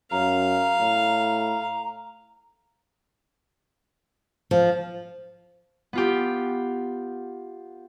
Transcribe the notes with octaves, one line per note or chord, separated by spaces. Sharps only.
F#2 F5 A#5
A2
F3
B3 F4 G4